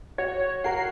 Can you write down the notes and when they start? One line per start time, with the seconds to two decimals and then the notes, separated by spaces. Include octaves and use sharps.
0.18 F#4 C#5
0.64 F#4 A#4 F#5 C7